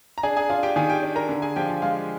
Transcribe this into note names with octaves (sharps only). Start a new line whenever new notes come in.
A#5
D4 G#4 G#5
G#4 G#5
D4 F4 F5
G4 G5
D#3 G#4 G#5
G4 G5
D4
A#4 A#5
D3
G#4 G#5
F3 G4 G5
F4 F5
G#3 F4 F5